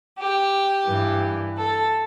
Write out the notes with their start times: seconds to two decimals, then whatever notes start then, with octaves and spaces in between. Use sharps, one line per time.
0.16 G4
0.86 G2 E3
1.56 A4